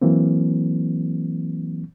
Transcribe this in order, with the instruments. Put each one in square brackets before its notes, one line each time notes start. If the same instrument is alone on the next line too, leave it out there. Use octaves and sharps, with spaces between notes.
[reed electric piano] E3 F#3 A#3 C4